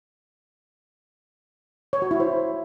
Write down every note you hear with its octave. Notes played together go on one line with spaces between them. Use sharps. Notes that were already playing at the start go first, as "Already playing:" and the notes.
C#5
F#4
E4
C5